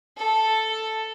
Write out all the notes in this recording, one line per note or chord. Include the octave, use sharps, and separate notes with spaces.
A4